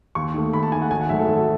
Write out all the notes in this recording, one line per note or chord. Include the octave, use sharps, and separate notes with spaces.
D#2 C#6
D#3 A3
D#2 B5
A5
D#3 A3 G#5
F#5
G#1 G#5
F#5
G#2 D#3 F#3 A3 E5
A4
G#1